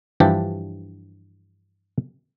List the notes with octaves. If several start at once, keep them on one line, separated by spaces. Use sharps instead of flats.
G2 E3 F3 D4 G4 D5